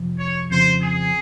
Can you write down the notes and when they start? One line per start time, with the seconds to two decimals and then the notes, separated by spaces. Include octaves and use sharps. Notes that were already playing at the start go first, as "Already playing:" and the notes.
Already playing: F2 C3 F3
0.19 C#5
0.50 F2 C#3 F3 C4 C5
0.82 G#4